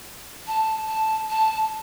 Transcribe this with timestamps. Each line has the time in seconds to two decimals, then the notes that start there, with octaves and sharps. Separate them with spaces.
0.47 A5
0.88 A5
1.30 A5